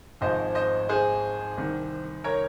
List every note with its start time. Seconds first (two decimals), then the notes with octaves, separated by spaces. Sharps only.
0.21 G#1 G#2 F3 C5 D#5
0.55 C5 D#5
0.89 G#4 C5
1.57 C2 C3 D#3
2.24 A#4 C#5